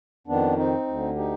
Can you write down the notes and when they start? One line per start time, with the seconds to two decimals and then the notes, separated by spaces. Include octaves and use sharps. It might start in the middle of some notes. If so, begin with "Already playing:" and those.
0.27 F2 D#3 B3 D4
0.57 C4 D#4
0.87 D2 D3
1.16 D#4 G4